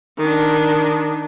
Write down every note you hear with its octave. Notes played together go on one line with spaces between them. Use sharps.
D#3 D4